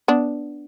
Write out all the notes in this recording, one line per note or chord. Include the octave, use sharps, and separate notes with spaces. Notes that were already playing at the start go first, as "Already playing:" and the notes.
B3 D4